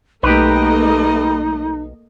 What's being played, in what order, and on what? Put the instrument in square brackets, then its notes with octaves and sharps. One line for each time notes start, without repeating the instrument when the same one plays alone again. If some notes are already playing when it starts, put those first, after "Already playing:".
[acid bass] B1 [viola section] A3 A#3 D#5 [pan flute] D#4 [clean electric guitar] G4 B4